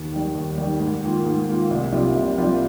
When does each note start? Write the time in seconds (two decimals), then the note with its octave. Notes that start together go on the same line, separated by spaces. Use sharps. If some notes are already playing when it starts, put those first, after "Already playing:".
Already playing: D#2
0.12 D#3 G3
0.35 D#2
0.58 D#3 G3
0.80 G#2
1.03 D#3 A#3 F4
1.25 G#2
1.48 D#3 A#3 F4
1.70 C2
1.92 C3 G3 A#3 F4
2.15 C2
2.37 C3 G3 A#3 F4